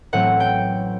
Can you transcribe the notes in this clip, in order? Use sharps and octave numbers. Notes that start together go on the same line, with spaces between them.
A1 A2 F#3 A3 C4 F#5
G5